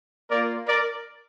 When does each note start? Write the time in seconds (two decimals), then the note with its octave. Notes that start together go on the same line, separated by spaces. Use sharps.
0.29 A#3 F4 A#4 D5
0.67 A#4 D5